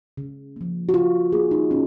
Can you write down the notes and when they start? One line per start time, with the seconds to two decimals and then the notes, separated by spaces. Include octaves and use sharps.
0.17 C#3
0.56 F3 A#3
0.89 F#4
0.93 C#3 F4
1.32 F3 A#3 G#4
1.51 D#4
1.71 A#2 C#4